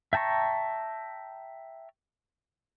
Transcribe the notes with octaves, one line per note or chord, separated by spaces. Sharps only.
E5 G5 A5 A#5 C#6